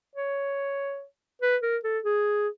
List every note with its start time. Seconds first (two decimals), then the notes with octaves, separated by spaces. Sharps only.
0.16 C#5
1.42 B4
1.62 A#4
1.84 A4
2.04 G#4